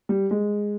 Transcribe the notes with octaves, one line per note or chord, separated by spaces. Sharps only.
G3
G#3